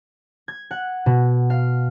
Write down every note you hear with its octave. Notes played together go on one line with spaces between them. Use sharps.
G#6
F#5
B2
F5